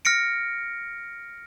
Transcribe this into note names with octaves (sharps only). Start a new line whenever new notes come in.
F6 A#6 C#7 D7